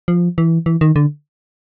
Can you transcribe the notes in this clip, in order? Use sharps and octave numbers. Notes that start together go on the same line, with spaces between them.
F3
E3
E3
D#3
D3